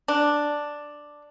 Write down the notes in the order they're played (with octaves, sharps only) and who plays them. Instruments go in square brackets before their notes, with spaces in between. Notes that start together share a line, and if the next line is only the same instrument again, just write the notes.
[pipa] D4